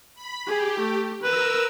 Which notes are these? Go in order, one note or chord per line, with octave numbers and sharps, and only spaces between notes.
B5
G4 G#4
A3
A#4 B4 E6